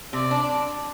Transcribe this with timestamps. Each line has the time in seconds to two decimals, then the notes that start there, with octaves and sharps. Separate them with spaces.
0.13 C3 D5
0.31 D4